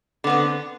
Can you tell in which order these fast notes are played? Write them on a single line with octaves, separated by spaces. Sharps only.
D3 B3 C4